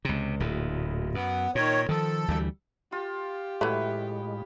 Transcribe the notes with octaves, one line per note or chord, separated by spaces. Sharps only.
C#2 C3
D1 D2 A#2
F#2 B3
A#2 D#3 C#5
D#3 F3 A4
D2 E3 G3
F4 G4
A2 E3 F#3 G#3 A3 B4 C#5